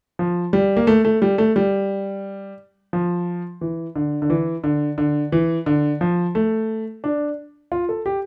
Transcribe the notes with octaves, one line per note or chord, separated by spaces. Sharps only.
F3
G3
A#3
A3
A3
G3
A3
G3
F3
E3
D3
D3
E3
D3
D3
E3
D3
F3
A3
D4
F4
A4
G4